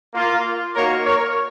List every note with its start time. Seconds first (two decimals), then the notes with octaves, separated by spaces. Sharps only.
0.14 A#3 F4
0.74 A#3 D#4 F#4 A#4 C#5
1.05 A#4 C#5